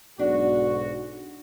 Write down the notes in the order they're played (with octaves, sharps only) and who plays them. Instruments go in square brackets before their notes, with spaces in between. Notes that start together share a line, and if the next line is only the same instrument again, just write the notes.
[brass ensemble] B1 G#2 F#4 [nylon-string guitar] D4